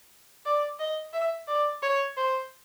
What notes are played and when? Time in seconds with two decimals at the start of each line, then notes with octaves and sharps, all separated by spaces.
0.46 D5
0.79 D#5
1.13 E5
1.48 D5
1.83 C#5
2.17 C5